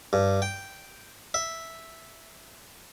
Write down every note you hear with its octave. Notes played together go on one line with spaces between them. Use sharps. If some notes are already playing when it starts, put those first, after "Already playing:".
G2
G5
E5